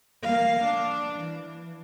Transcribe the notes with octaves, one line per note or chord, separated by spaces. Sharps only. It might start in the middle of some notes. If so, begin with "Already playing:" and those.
A#3 F5
D4
E3